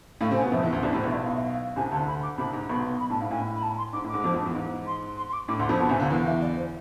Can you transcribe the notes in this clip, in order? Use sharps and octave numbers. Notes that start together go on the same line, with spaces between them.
A2 A3 F5
C3 C4
G#5
B2 B3
F2 F3 E5
E2 E3
D2 D3
C2 C3 D5
A2
C5
B1 B2
E5
D5
F5
E5
F5
C2 C3 G#5
D2 D3 A5
B5
D6
C2 C3 B5
G#2
B1 B2 B5
B5
A2 A5
G#2 F5
A2 G#5
B5
A5
C6
G#2 D6
A2
G#2 G#3 D6
F2 F3
F2 F3
E2 E3
G#2
C6
C6
C6
D6
A2 D6
D2 D3 C6
F2 F3 B5
B2 B3 A5
C2 C3 G#5
D2 D3 F5
E2 E3 F5
E5
D5
C5